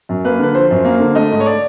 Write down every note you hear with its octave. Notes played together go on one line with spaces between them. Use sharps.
F#2
A#3 B4
D3 B4
F3 C5
F#2
A#3
D3
A3 D#5
G#2
C#5
D5